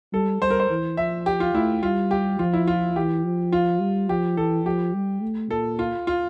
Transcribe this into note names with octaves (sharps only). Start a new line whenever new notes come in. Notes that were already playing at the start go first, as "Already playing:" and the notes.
G3 A4
G3 C5
A#4
C5
E3
F3 E5
G4
F4
A3 E4
G3 F4
G4
F3 F4
E4
F4
E3 G4
F3
F4
G3
F3 G4
E3 A4
F3 G4
G3
A3
A#2 A4
F4
F4